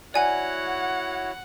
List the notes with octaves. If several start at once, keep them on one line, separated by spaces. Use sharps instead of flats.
E4 F#4 C#5 D5 F#5 G#5 C#7